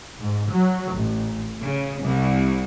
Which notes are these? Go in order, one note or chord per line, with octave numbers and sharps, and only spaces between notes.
G#2
F#3
A1
C#3
C2